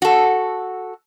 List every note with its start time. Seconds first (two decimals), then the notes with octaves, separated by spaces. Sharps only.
0.02 F#4 A4